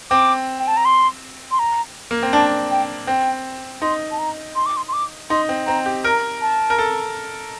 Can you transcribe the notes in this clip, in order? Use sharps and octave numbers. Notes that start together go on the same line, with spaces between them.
C4 D6
G5
A5
A#5
C6
C6
A#5
A#3
C4
D4 A5
G5
C4 G5
D#4 C6
A5
A#5
C6
D6
C6
C6
D6
D#4 C6
C4
C4 A#5
G4
A#4 A#5
A5
A#4
A4